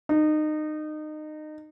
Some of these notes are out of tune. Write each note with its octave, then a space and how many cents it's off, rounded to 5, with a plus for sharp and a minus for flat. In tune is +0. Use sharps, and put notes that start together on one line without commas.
D#4 -25